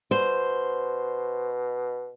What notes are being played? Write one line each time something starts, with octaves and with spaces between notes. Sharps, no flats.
B2 C5